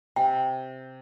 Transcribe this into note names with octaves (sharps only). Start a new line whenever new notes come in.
C3 G5